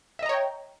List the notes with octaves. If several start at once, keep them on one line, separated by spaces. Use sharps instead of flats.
C#5 D#5 E5 G5 A#5